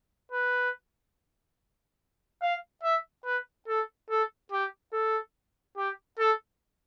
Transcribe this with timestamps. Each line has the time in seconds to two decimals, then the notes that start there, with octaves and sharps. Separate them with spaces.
0.32 B4
2.42 F5
2.84 E5
3.25 B4
3.68 A4
4.10 A4
4.52 G4
4.93 A4
5.77 G4
6.19 A4